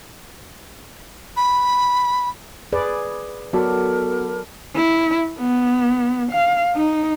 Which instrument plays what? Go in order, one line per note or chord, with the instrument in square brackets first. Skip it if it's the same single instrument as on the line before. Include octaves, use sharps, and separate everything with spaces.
[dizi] B5
[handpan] G#4 B4 D5
[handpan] F#3 [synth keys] B3 F#4 [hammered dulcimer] A4 D5 B5 [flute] A#4
[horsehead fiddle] E4
B3
F5
D#4